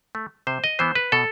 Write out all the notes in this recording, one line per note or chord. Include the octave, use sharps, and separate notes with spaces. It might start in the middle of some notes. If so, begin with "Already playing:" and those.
A3
C3 C5
D#5
E3 B3 C5
B4
B2 A4